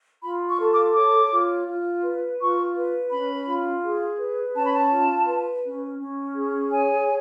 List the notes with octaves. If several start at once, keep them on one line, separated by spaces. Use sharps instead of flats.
F4 B5
C#6
A4
D6
C#5 D6
F4
F4
B4
F4 C#6
B4
C#4 B5
F4
G#4
B4
C#4 A5
B5
A5
F4
B4
C#4
C#4
G#4
C#5 G#5